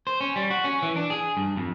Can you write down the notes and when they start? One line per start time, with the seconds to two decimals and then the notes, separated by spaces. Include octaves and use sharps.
0.07 C5
0.21 C#4
0.36 G3
0.50 F#4
0.64 C#4
0.82 E3
0.96 D4
1.10 G#4
1.37 G2
1.57 F2